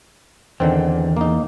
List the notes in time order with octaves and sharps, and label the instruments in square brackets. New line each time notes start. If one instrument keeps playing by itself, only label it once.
[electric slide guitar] E2 [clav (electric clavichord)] D3 D#3 C4
[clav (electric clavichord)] A#3 D#4